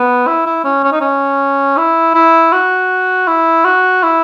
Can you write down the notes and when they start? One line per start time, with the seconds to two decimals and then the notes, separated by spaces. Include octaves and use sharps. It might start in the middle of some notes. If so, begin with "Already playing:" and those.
Already playing: B3
0.27 E4
0.46 E4
0.64 C#4
0.84 C#4
0.92 D#4
1.01 C#4
1.77 E4
2.14 E4
2.52 F#4
3.27 E4
3.65 F#4
4.03 E4